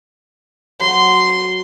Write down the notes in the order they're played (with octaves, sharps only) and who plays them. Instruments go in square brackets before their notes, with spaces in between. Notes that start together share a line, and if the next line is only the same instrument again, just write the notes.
[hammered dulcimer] F#3 [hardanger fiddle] C6